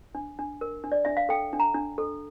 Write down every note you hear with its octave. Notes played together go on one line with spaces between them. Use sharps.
D4
D4
A#4
D4
D5
D4 E5
F5
A4 G5
D4
A#5
D4
A4